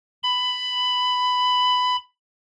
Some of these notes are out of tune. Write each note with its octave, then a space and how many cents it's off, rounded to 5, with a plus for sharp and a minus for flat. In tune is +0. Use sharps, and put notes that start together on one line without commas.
B5 +15